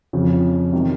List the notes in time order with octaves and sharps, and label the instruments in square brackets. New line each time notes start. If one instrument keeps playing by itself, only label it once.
[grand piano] F2 C#3 F3
C3 D#3 G3